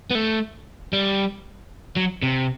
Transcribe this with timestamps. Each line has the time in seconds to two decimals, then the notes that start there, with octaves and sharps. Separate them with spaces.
0.11 B3
0.15 A3
0.93 G3
1.96 F#3
2.22 C3